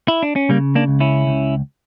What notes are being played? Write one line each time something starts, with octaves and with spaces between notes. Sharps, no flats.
E4
D4
C#4
C#3 G3 A#3
A#3 D4
C#2
C#4 E4
C#2